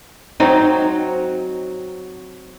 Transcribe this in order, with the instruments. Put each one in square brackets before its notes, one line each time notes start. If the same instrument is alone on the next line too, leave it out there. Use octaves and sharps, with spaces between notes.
[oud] F#3 C4 D#4